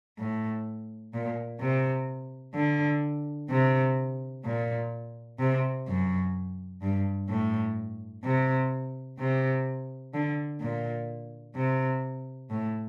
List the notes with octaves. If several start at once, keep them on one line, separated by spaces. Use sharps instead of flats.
A2
A#2
C3
D3
C3
A#2
C3
F#2
G2
A2
C3
C3
D3
A#2
C3
A2